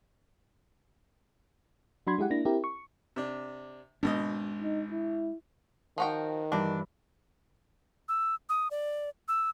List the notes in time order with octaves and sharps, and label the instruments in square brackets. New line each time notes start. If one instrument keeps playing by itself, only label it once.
[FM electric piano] F#3 D4 F#4 B5 C6 G#6
G#3 E4 G4 F#5
A#3 D4 E4 A#6
C4 E4 G4 A#4
C#6
[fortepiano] C3 D4
[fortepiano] G#1 B2 D#5 [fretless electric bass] G#3 A#3 D4
[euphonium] D#4
E4
[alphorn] D#3 [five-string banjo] F3 F#4 G5
[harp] G2 E3 [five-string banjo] D4
[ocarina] E6
D#6
D5
E6